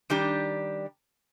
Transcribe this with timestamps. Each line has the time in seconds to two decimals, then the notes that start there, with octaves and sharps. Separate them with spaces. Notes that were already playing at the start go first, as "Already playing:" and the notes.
0.10 D#3 G3 D4 G4